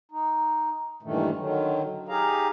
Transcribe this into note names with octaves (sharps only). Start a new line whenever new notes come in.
D#4
G2 A#2 D#3 E3 A3
D3 D#3 F#3
D#4 G4 G#4 F5 A#5